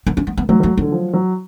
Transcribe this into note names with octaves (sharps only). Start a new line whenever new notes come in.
B3
C#4
B3
B3
F#3 A3
F#3 A3
D3 F#3
F3
F#3